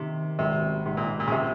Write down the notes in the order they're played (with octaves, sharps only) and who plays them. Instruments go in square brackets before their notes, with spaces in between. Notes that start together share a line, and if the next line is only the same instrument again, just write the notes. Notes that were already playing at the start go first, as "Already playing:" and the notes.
Already playing: [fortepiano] C3 [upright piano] D#3 A#3
[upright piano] G#1 [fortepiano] C3
[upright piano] G#2 [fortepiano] C3
[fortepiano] A#2
A#2
C#3
[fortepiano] C3 [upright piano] G4